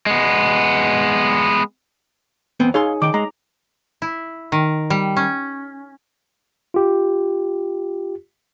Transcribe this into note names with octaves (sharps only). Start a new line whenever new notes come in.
G#3 B3
E2 B3 C4
D#4 G#4 C#5 F5 C6
D#3 G5 D6
G#3 A#5
E4
D#3
G3
C#4
F4 G4